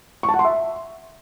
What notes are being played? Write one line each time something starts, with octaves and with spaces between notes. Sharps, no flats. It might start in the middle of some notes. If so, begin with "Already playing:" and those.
C#6
A5
F#5
C6
E5